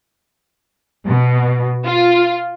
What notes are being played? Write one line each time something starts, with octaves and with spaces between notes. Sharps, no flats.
B2
F4